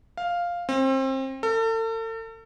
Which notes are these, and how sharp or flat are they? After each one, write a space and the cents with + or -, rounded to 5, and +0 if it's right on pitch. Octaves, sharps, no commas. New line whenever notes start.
F5 +0
C4 +30
A4 +40